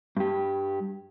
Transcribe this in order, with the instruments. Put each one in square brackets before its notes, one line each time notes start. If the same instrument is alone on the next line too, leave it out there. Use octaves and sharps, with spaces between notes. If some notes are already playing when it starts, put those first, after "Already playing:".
[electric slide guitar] G2 G4